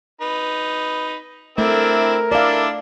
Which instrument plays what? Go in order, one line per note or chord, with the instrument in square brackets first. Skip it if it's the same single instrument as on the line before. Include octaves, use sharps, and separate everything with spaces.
[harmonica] D#4 B4
[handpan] A3 [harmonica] C4 D4 E4 [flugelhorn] A#4
[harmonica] D4 E4 A4 [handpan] D5 F5